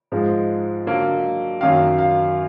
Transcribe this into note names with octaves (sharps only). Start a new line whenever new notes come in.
G#2 F3 G#3
D3 F#3 A#3
F#2 D#3 F#3 A#3 F5
F5